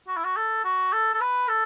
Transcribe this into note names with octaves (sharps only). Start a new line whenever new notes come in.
F#4
E4
F#4
A4
F#4
A4
A4
B4
A4